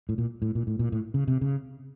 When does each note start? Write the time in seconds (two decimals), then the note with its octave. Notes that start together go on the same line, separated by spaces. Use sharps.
0.09 A2
0.18 A#2
0.42 A2
0.55 A#2
0.67 A2
0.79 A#2
0.92 A2
1.14 C#3
1.28 C3
1.41 C#3